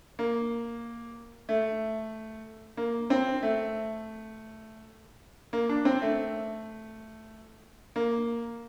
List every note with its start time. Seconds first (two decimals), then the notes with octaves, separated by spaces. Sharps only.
0.19 A#3
1.49 A3
2.77 A#3
3.10 C4
3.43 A3
5.53 A#3
5.69 D4
5.85 C4
6.02 A3
7.96 A#3